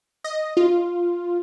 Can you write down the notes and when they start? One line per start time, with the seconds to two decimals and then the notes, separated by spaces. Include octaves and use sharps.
0.24 D#5
0.57 F4